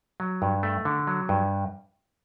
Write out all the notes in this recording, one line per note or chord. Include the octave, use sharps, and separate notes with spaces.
F#3
G2
A3
D3
F#3
G2